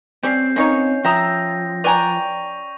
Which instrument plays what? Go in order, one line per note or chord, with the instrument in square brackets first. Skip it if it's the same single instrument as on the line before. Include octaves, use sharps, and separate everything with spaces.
[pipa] G3 C#4 [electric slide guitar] C4 [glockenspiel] G6 C7
[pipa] A#3 D#4 C#5 [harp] C#4
[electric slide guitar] F3 [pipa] E5 A#5 [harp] G5 D#6 E6 [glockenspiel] A#6
[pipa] B4 G#5 A#5 [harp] D5 G5 [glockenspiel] C#6 D#7 F7